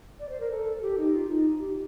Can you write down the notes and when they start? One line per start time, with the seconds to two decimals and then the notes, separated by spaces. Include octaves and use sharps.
0.20 D5
0.29 C5
0.40 A#4
0.51 A4
0.82 G4
0.98 D#4
1.13 F4
1.29 D#4
1.59 G4